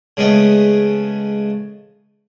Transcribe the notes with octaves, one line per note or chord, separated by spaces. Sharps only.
C#3 G#3 A3 B3